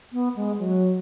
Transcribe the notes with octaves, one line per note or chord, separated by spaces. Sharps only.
B3
G#3
F#3